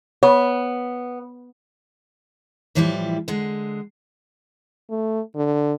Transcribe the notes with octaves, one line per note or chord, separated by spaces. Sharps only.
B3 C#5
A2 E3 F3 G3 E4 G4
D3 G#3
A3
D3